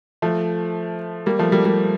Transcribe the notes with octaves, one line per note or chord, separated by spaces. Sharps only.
F3 A3
G3 A#3
F3 A3
G3 A#3
G3 A#3